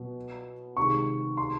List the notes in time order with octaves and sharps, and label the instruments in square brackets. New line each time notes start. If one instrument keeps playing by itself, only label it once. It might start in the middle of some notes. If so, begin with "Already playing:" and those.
Already playing: [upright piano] B2 F#3 B3
[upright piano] C3 D#3 G#3 [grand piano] C#6
[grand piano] C6